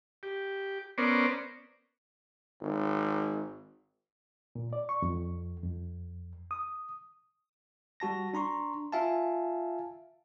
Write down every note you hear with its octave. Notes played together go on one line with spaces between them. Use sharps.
G4
B3 C#4 A#4 C5 D5
G#1
A#2
D5
C#6
F2
F2
D#6
G3 F#4 A5 A#6
D4 A#5 C6 C#6
F4 E5 F5 G#5 A5